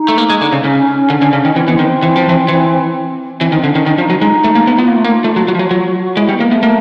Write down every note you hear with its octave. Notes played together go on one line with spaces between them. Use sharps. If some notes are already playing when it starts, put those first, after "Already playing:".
Already playing: D#4
A3
A#3
G#3
D3
C#3
C#3 C#4
D3
D3
C#3
D#3
E3 C4
E3 B3
D#3 C4
E3
F3
E3
E3
E3 C4
D#3 C4
D3 C#4
D#3 C#4
D#3 D4
F3 D4
D#4
F#3
G#3 D#4
A3
A#3
B3
B3 F4
A#3
A3
A#3
A3
F#3
F#3
F3
F#3
F#3 F#4
F#4
F#4
G#3 E4
G3
B3
A#3
A3 B3
A#3